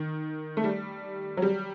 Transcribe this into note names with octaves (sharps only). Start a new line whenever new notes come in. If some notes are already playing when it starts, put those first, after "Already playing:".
Already playing: D#3
A3
G3
F#3
G3